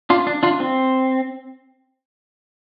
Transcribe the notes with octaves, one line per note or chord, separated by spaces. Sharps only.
D4 F4
D4
D4 F4
C4